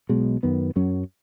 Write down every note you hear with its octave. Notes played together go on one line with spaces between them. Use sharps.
B1 B2 G#3
F#2 D#3 B3
F#2 F#3 C#4